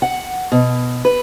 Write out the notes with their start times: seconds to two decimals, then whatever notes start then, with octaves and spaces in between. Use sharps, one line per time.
0.02 F#5
0.52 B2
1.05 B4